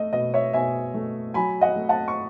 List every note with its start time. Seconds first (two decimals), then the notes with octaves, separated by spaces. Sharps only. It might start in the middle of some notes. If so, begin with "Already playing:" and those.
Already playing: A3 D#5
0.13 B2 D#5
0.34 C#5 E5
0.53 B2 E5 G#5
0.94 A3
1.34 F#3 G#5 B5
1.61 D#5 F#5
1.76 A3
1.89 F#5 A5
2.08 C#6